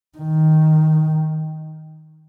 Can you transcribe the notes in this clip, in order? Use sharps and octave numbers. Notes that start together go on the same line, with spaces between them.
D#3